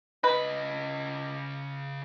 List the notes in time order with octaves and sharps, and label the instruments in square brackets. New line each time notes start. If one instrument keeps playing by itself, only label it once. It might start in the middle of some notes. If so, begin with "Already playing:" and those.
[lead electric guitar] C#3 D#5 [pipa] B4